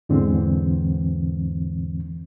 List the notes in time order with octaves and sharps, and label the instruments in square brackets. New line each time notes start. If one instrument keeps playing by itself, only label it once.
[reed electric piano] E2 G#2 D3 E3 C4